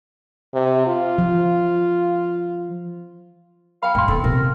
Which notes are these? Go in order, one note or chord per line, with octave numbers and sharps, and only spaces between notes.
C3
F4
F3
F5 G5 B5
G2 A#3 G5 C6
D#3 B3 A4
C3 A#4